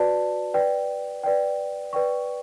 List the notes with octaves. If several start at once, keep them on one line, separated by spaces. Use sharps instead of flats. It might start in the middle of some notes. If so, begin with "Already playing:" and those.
Already playing: F#4 B4 D5 A5
B4 D5 G5
B4 D5 G5
B4 D5 G5 C#6